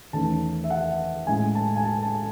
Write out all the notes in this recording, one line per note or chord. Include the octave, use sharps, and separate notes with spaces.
E2 D#3 A3 C#4 A5
E5
F#5
A2 G#3 C#4 G#5
A5
G#5
A5
A5